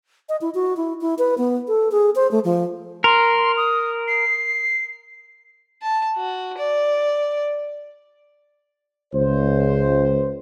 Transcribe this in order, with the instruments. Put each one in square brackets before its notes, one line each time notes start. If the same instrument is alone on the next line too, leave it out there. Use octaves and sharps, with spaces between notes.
[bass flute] D#5
E4
F#4
E4
E4
B4
B3
A4
G#4
C5
A3
F3
[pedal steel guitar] A#4 [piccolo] C6
[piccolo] D#6
C7
[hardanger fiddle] A5
F#4
D5
[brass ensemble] C#2 C5